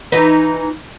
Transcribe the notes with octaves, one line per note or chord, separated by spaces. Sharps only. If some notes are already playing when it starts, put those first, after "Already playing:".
E3 D#4 B4